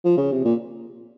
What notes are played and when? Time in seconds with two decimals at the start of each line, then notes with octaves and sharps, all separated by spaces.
0.05 F3
0.18 C#3
0.31 C3
0.45 A#2